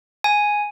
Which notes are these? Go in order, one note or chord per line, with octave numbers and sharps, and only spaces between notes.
G#5